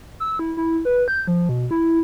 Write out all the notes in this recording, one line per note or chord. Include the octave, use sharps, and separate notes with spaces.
E6
E4
E4
B4
G6
F3
B2
E4